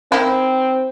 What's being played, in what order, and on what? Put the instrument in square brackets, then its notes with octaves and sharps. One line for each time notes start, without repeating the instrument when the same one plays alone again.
[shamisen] D#3 E4 [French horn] C4